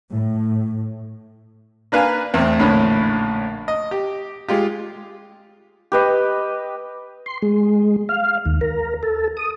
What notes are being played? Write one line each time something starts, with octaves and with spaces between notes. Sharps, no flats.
A2
A#3 D4 B4 F5 G#5
E2 A2 C4
A#1 A2 D3 C#4 B5
D#5
G4
G#3 F4 G4
G4 B4 D#5
C6
G#3
F5
D#2
A#4
A4
D#6